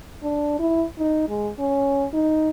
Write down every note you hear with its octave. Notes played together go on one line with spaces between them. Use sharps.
D4
E4
D#4
G#3
C#4
D#4